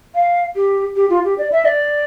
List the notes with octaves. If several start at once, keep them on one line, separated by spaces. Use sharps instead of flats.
F5
G4
G4
F4
G4
D5
E5
D5